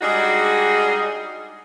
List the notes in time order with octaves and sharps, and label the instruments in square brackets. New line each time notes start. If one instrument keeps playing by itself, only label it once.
[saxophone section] G3 G#3 D4 D#4 F#4 G#4